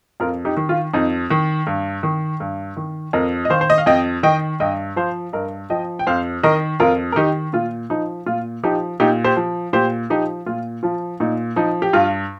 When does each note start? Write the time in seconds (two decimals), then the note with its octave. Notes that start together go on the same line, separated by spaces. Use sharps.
0.20 F2 F4 A#4
0.45 D#4 G4
0.57 D#3
0.69 F4
0.93 F2 D#4
1.30 D#3
1.67 G2
2.03 D#3
2.40 G2
2.77 D#3
3.13 F2 A#4 D#5
3.45 D#5
3.50 D#3 C5 F5
3.61 C5
3.70 D#5
3.78 F5
3.86 F2 D#5 G5
4.23 D#3 D#5 G5
4.60 G2 D#5 G5
4.96 F3 C5 F5
5.33 G2 A#4 D#5
5.70 F3 D#5 G5
5.99 G5
6.07 F2 C5 F5
6.43 D#3 A#4 D#5
6.80 F2 F4 A#4
7.12 A#4
7.16 D#3 D#4 G4
7.53 A#2 F4
7.90 F3 D#4
8.26 A#2 F4
8.63 F3 D#4 G4
9.00 A#2 D#4 G4
9.24 G4 C5
9.36 F3
9.73 A#2 G4 C5
10.10 F3 D#4 G4
10.46 A#2 F4
10.83 F3 F4
11.20 A#2 D#4
11.56 F3 D#4
11.82 G4
11.93 G2 F4